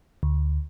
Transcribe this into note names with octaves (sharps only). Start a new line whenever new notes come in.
D2